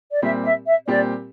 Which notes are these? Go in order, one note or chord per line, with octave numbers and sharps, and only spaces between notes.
D5
A#2 G3 C4 G4 E5
E5
E5
A#2 G3 C4 G4 D5